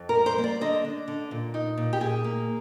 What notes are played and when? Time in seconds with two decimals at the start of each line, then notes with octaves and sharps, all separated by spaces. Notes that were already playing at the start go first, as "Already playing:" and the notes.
Already playing: F2
0.09 A#4
0.14 G3
0.26 C5
0.38 A#3
0.44 D5
0.61 D3 D#5
0.85 D4
1.08 D3
1.31 A#2
1.54 D#4
1.77 A#2
1.93 G4
2.00 A#2 G#4
2.24 A#3